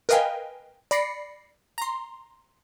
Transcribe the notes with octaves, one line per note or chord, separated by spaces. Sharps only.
A#4 B4 D#5 F5 G5 G#5
D5 B5 A#6 C7 C#7
A#5 C6